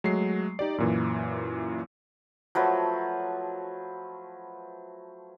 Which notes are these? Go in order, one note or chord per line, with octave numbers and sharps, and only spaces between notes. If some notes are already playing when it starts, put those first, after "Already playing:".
F#3 G#3 A3 C7
D#4 G4 D5
F#2 A#2 E3
F3 F#3 A3 B4